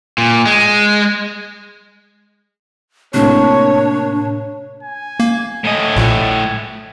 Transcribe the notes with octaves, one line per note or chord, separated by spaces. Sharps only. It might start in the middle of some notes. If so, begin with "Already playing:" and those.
A#2
G#3
A2 C3 A#3 D4 C#5
G#5
A#3
A2 D#5 G#5
A#1 A#2